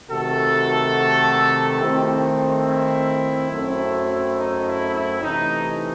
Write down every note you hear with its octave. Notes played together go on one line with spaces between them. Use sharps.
C3 D#3 A3 F#4 A4
D#3 A3 C4 E4 G4
E4
F#2 F#3 A3 C4
D#4
E4
E4
C3 E3 A3 D#4